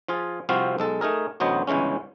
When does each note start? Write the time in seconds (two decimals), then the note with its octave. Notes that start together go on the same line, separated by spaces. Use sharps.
0.08 F3 F4 G#4
0.49 C2 C3 F3 C4 F#4 F5
0.78 B1 G#3 A4
1.01 A3 D#4 G#4 A#4
1.40 A1 D2 F#3 B3 C5 D#5
1.67 G1 C#2 E3 G#3 C#4